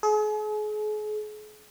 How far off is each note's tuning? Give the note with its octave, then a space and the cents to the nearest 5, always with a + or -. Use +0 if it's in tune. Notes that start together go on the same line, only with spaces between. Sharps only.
G#4 +40